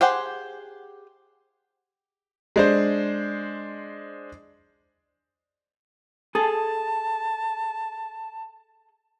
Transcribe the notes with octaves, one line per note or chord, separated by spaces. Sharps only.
G4 G#4 C5 F#5 G5
G#3 D4 C5
G#4 A4 A5